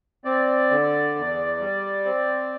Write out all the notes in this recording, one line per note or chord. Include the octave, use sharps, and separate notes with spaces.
C4 D5
D3
E2
G3
C4